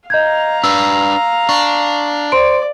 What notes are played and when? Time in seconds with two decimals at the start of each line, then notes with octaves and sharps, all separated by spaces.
0.10 D#5 F5 A#5 G6 G#6
0.64 D4 B4 E6
1.49 D4 C#6
2.32 C5 D5 C6 D7